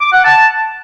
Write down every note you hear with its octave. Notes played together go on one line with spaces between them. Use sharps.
D6
F#5
A5